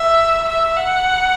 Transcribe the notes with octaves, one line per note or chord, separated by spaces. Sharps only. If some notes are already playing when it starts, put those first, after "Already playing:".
Already playing: E5
E5
F#5